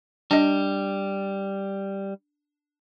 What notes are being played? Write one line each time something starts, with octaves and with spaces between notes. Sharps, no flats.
G3 D4 D#5